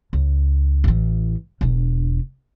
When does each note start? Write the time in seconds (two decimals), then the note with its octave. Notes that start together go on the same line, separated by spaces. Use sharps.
0.13 C#2
0.84 A1 E3
1.61 E1 D4